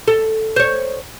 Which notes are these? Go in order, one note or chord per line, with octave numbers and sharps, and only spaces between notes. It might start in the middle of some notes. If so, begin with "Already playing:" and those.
A4
C5 C#5